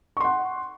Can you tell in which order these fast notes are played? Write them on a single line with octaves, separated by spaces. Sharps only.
C#6 C6 F#5